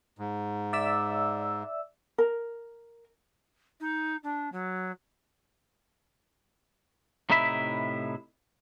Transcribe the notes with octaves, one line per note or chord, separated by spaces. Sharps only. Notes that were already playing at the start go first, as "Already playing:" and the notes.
G#2
D5 E5 E6
A#4
D#4
D4
F#3
A2 C3 D#4 E4 E5 B5